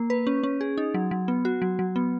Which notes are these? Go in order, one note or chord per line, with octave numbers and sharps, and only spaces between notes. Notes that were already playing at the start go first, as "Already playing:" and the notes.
Already playing: A#3
B4
C#4
C#4
G#4
D#4
F#3
F#3
B3
F#4
F#3
F#3
B3